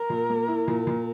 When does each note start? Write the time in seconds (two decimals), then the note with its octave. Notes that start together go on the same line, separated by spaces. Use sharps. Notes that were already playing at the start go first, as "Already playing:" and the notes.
Already playing: A#4
0.10 A#2
0.30 A#3
0.48 E4
0.68 A#2
0.87 A#2